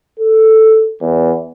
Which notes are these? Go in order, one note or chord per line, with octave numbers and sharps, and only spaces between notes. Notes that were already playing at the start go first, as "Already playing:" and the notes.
A4
E2